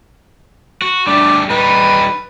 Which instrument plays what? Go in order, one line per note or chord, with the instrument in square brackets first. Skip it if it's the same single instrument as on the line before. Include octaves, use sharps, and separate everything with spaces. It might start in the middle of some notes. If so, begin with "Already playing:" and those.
[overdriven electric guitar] F#4
[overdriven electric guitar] G3 A3 [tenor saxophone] D4
[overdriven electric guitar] G3 D#4 [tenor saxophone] B4